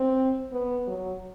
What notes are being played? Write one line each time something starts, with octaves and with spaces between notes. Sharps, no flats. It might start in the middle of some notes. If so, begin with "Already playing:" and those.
Already playing: C4
B3
F#3